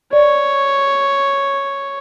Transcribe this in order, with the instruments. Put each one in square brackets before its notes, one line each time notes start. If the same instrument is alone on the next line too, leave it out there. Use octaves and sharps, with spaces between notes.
[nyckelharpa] C#5 [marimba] D5